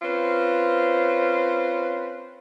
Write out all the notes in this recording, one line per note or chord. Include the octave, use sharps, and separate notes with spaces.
C4 C#4 F4 B4 C5